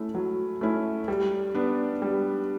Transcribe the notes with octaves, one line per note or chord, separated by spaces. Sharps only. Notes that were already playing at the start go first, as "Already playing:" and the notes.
Already playing: A3 C#4 E4
F#3
A3 C#4 E4
G3
B3 D4
G3